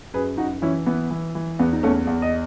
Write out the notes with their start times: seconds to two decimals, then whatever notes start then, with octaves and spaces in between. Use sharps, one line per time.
0.14 F#2 G#4 B4
0.37 F#2 D#4 F#4
0.62 E3 C#4 E4
0.86 E3 B3
1.11 E3
1.35 E3
1.59 E2 B3
1.73 D#4
1.83 E2 A3 C#4
2.07 E2
2.22 D#5